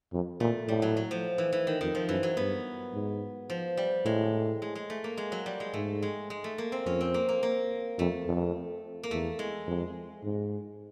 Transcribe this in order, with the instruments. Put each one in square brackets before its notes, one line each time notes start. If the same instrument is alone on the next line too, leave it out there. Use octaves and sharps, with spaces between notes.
[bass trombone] F2
[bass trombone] A#2 [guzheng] A3
[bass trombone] A2 [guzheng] G3
[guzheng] F#3
F#3
F3
E3
E3
D#3
[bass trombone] F2 [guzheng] D#3
[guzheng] F3
[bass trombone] F#2 [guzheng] E3
[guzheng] F#3
[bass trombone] G2 [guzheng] B3
[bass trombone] G#2
[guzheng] F3
G3
[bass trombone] A2 [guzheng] G#3
[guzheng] G#3
G#3
A3
A#3
G#3
F#3
G3
G#3
[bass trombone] G#2 [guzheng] A3
[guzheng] G#3
G#3
A3
A#3
C4
[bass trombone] F2 [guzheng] C#4
[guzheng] C4
A#3
A#3
A#3
[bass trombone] F2 [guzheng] A3
[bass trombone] F2
[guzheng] A#3
[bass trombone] E2 [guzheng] A3
[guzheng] G#3
[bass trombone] F2
G#2